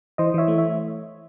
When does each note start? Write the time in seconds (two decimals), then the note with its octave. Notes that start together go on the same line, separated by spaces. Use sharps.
0.18 E3 C5 D#5
0.34 E3 C#5 E5
0.48 A3
0.58 C#5 E5